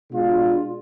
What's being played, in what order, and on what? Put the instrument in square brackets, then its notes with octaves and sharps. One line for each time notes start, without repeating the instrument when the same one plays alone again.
[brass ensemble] B2 G#3 D4 F4